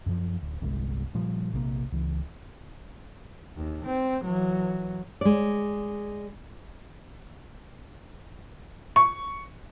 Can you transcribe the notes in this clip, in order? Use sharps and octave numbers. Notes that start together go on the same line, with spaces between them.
F#2 E3 F3
D1
G1 C2 D3 G#3
A#2 F3 G3
A#1 C3 G#3 A#3
C#2 E3
D#2
C4
E3 F#3
G#3 D5
C#6